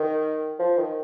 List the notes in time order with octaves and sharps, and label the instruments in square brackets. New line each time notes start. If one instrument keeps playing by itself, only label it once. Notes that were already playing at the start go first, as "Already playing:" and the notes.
Already playing: [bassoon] D#3
F3
D#3